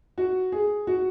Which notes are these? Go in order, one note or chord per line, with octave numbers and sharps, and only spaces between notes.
F#4
G#4
F#4